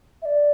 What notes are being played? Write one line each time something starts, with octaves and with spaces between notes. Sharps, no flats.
E5
D5